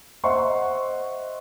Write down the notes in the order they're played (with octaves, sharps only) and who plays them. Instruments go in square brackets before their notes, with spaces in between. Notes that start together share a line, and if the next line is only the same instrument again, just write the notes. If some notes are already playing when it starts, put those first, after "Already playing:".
[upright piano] C5 D#5 E5 F#5 C6 C#6